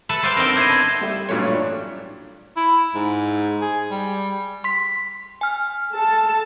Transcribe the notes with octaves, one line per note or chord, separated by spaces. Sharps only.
A4 B4 E5 A5 B5
B4 C5 D5 E5 F5 G5
B3 C4 D4 D#4 A#4
E4 C5 D#5
D4 B5
G3 A4 E5
A1 G2 A#2 F#3 A3 C#5
D4
E4
G#2
G#4
G3
C6 B6
G#5 F6
A4 A5